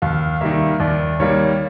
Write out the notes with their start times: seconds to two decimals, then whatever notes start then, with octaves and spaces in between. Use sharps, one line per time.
0.02 D#2 F5
0.41 D#3 G3 A#3 E5
0.80 D#2 D5
1.20 D#3 G3 A#3 C#5